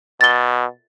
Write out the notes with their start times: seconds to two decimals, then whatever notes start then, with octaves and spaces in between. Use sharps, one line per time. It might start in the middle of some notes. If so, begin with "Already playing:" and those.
0.21 B2 A6 G7